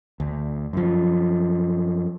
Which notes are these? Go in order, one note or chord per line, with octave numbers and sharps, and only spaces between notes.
D2
F#2 F3